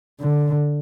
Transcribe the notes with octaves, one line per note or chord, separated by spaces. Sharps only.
D3